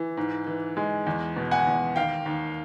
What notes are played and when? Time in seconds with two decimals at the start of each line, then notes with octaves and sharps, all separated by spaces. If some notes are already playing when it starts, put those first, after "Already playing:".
Already playing: E3
0.17 G#2
0.47 E3
0.77 G#3
1.07 E2
1.37 B2
1.51 F#5 G#5
1.67 E2
1.96 D#2 F5 G5
2.26 D#2